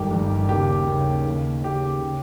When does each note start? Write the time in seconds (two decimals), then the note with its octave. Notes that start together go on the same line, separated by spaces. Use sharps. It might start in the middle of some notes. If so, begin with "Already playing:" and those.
Already playing: G1 G2 D#3 G4
0.11 G1 G2 D#3
0.49 D#2 C#3 G4
0.87 D#2 C#3
1.25 D#2 C#3
1.64 D#2 C#3 G4
2.01 C#3